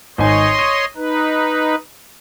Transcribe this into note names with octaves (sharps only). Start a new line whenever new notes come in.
G#1 D#4 C#5 D#5 G#5 C6
D#7
D#4 B4